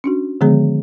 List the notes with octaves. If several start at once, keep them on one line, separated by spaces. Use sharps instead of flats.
C#4 D4 F#4
D3 D#3 F3 G#3 B3 G#4